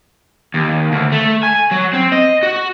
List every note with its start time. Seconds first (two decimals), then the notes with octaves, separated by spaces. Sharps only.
0.54 D#2
0.92 D2
1.12 A3
1.43 G#5
1.71 F#3
1.93 C4
2.12 D#5
2.43 F#4